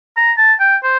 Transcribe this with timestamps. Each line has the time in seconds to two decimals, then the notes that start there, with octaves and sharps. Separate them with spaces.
0.17 A#5
0.38 A5
0.60 G5
0.83 C5